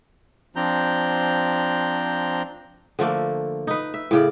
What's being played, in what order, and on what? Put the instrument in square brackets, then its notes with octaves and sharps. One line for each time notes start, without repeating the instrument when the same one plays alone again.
[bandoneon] F3 C4 D4 A#5 G6
[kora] D3 F3 A3 A#3
D#4 B4
E5
A2 C#3 D5